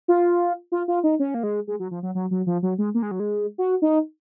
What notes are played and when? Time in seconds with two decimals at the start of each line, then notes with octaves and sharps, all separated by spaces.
0.08 F4
0.72 F4
0.88 F4
1.04 D#4
1.19 C#4
1.34 A#3
1.43 G#3
1.67 G#3
1.80 F#3
1.91 F3
2.03 F#3
2.15 F#3
2.31 F#3
2.46 F3
2.63 F#3
2.78 G#3
2.94 A#3
3.02 G#3
3.11 F#3
3.20 G#3
3.58 F#4
3.82 D#4